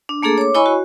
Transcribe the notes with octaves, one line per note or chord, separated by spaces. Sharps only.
D4
A3 A#3 D4 G#4 A4
C#5 D6
E4 C#5 D#5 G#5 B5 C#6
F#4